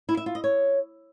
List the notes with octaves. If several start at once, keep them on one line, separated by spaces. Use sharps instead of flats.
E4
E5
F4
D#5
C#5